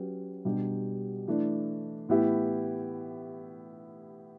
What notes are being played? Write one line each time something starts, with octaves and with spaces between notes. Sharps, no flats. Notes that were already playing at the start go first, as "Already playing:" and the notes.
Already playing: F#3 C#4 G4 B4
B2 G3 D4 G4
E3 A3 D4
A2 E3 B3 E4 G4